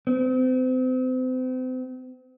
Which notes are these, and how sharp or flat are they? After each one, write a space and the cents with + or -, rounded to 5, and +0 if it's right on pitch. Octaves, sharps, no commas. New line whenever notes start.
C4 -35